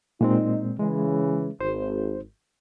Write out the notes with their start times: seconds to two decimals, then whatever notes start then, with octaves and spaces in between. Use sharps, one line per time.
0.21 A#2 G#3 C4 D#4
0.79 C#3 E3 G#3
1.60 G#1 C5